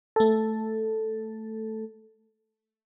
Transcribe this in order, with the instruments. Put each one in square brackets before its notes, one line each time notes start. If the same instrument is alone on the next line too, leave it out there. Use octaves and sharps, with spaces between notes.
[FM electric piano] A3 A4